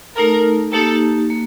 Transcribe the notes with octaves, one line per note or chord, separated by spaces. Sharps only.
A3 D#4 A4 A#4
A#3 D#4 G4 A4
A#3